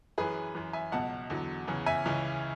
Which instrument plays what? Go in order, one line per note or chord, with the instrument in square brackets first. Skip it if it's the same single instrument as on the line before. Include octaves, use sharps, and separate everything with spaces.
[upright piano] F#2 E3 G#4 B4
F#2 E3
E5 G#5
C#2 B2 F#3 F#5 A5
E2 D3 F#3
E2 C#3 E3
E5 G#5
C#2 C#3 E3